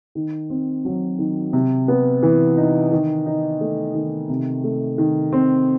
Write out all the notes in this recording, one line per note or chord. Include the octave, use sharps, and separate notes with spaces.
D#3
C4
F#3
D#3
C3
B3
E3
D#4
D#3
D#4
A3
D#3
C3
A3
D#3
C4